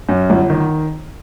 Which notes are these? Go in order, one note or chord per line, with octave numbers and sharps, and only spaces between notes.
F#2
G1
D#3